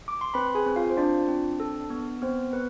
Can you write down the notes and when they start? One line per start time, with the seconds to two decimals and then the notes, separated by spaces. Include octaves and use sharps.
0.08 D6
0.21 C6
0.34 C4 B4 B5
0.55 G#4 G#5
0.66 C4
0.76 F4 F5
0.90 C5
0.97 D4 F4 D5
1.28 C4
1.60 A4
1.90 B3
2.22 B3 C4 C5
2.53 B3 B4